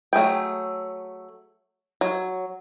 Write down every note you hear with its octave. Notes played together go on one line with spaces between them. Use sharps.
F#3 A3 G#4 G5
F#3